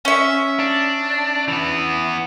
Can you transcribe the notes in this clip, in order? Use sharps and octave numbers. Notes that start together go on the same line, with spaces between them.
C#4 E5
D4
E3 B3